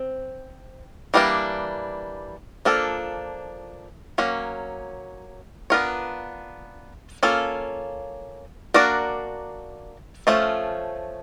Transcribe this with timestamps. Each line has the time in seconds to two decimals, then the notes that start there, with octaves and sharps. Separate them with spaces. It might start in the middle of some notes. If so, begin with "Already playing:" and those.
Already playing: C4
1.14 E3 G3 A#3 D4
2.65 F3 A#3 D4 F4 A4
4.18 F#3 A#3 C#4
5.70 B3 D4 F4 A#4 C#5
7.23 A#3 C#4 F4 A4
8.74 A#3 D4 F#4 A#4 D5
10.27 F3 A3 C#4 F4